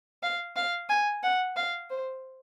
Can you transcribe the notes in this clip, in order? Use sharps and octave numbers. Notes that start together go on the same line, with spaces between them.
F5
F5
G#5
F#5
F5
C5